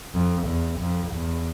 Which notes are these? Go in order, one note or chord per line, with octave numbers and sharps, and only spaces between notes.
F2
E2
F2
E2